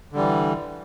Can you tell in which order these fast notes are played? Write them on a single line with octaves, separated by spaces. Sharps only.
D3 G3 E3